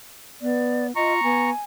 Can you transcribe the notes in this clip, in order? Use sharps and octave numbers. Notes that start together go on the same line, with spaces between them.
B3 D5
F4 D#5 A#5 C#6
B3 G#5